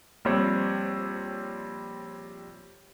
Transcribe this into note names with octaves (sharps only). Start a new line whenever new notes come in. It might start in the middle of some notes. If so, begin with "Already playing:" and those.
A#1 G3 C4 C#5 E6